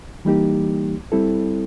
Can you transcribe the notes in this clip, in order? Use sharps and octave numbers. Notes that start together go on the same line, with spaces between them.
E3 G3 A#3 D#4 G4
G3 C4 E4 A4